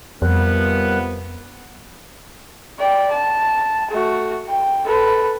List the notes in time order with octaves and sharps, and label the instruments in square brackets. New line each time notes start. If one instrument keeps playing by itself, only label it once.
[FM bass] F2 [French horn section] C3 F3 B3 [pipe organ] G3 A#4 F#6
[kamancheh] D5 G5
A5
A3 F#4
G5
A4 B4